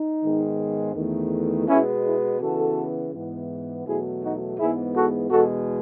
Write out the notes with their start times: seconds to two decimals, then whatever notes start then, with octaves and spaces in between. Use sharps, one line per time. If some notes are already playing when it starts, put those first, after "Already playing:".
Already playing: D#4
0.23 G#2 D#3 G#3 B3
0.95 E2 D#3 A3
1.68 B2 G#3 B3 C#4 E4
2.04 E4 G#4
2.40 C#3 E3 B3 F#4 A4
3.13 G#2 E3 B3
3.86 E2 B2 F#3 A3 E4 G#4
4.21 D#4 F#4
4.58 G#2 E3 G#3 B3 E4 G#4
4.94 F#4 A4
5.30 E2 B2 G#3 F#4 A4